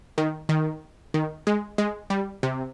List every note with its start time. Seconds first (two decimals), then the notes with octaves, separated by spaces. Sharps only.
0.18 D#3
0.49 D#3
1.14 D#3
1.47 G#3
1.78 G#3
2.10 G3
2.43 C3